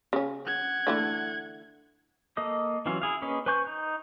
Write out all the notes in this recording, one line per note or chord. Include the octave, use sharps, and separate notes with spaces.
C#3 C#4
F#5 G#6
D3 E3 A3
A#3 A4 D#5 D#6
E3 F#3 C#4 F4
E4 G#4 F5
A#3 C#4 G#4 B4 D#5
B4 C5 G#5 C#6 G6
D#4